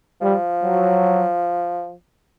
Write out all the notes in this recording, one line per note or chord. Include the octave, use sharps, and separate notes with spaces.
F3 G3
F#3